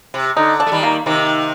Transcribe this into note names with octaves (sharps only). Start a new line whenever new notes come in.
C3
D3 D#4
D4
A3
D#3 G3
A#3
C3 D#3 A#3